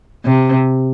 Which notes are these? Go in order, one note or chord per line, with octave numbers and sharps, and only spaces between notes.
C3